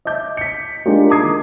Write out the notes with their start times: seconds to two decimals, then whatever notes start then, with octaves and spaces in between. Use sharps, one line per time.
0.05 D#5 E5 D6 G6
0.37 B6 C#7
0.86 G#3 A#3 D4 D#4 F4 G4
1.10 A#5 D6 D#6 G#6 C7
1.24 D#3